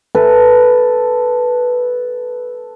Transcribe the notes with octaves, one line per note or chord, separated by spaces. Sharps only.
A4 B4